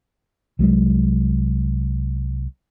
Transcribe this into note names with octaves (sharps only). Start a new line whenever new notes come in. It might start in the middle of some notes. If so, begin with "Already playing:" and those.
C2 F#3 G#3